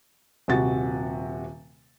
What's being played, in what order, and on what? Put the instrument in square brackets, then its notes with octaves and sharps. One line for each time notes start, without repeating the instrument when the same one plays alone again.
[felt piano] D#1 C3 F#4 A6